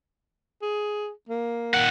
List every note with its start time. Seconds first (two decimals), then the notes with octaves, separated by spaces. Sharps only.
0.62 G#4
1.29 A#3
1.74 D#3 F#5